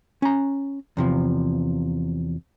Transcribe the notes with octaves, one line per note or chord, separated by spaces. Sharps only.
C#4 A#5
E2 C3 F3